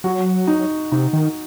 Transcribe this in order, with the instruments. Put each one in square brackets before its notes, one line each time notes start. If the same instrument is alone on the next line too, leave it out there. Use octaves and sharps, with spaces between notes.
[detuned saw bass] F#3 [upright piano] F#4
[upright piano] D#4
[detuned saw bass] C3 [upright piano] D#4
[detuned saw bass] D#3